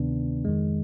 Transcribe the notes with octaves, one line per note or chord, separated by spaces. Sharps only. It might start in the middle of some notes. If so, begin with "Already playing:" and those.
Already playing: D2 C3 D#3 B3 D4
F2 D#3 G#3